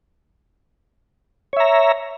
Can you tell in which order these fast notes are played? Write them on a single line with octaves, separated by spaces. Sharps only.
C#5 E5 A#5